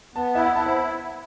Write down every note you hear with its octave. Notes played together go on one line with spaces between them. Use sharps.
B3 A5
E4 E5
F#5
E4 A5
C5